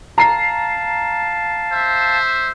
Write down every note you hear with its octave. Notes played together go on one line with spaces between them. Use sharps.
F5 A5 A#5 C7
C5 E5